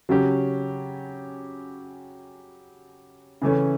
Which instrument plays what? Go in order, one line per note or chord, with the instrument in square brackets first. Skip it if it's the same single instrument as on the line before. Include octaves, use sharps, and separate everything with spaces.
[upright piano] C#3 F#3 C#4 G4
C#3 E3 A3 C#4